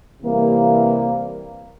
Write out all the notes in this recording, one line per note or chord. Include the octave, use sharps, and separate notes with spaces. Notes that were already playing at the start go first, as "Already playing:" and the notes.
C3 E3 G3 A#3